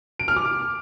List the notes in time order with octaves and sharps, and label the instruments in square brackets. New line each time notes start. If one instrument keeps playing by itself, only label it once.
[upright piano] D7
F6
D6